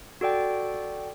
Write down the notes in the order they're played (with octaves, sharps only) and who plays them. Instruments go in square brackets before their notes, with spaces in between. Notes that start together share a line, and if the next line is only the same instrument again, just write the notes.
[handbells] F#4 A4 D5 G5